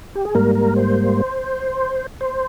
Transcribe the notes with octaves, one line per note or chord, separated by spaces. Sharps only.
G4
G#4
G#2 G3 A#3 A#4
A#4
C5
C5